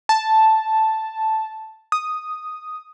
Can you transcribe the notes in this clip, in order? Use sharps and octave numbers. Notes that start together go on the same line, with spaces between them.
A5
D#6